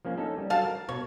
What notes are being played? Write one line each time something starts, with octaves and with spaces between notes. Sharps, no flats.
F3 A#3 C#4
C#4 D#4 A4
G3
F#3 A4 F5 A5
A#4
B2 C#5